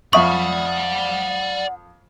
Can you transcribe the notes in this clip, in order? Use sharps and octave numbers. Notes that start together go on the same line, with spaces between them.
F2 D5 E5 F#5 B5 C#6 D#6